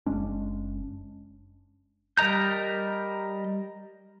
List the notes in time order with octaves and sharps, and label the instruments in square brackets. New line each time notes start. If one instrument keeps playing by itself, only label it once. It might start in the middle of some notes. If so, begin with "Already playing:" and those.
[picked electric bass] F#1 G#3 C#4 D4
[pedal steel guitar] G3 A#4 D#5 A#5 G6